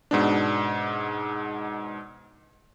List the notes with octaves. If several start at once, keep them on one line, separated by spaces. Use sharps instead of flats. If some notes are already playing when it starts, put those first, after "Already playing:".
G#2 B2 D4